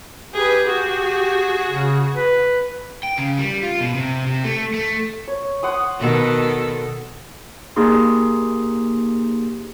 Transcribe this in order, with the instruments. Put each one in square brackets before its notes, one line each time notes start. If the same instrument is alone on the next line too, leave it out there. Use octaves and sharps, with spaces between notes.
[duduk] G4 [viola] G#4 B4
[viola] F#4 G#4
[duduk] C#3
B4
[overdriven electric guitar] G5
C#3
G3
F4
B2
C3
C3
A3
A3
[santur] C#5
F#5 C6 D#6
[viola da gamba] B2 D#3 A4
[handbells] A#3 D#4 G4 G#4 C6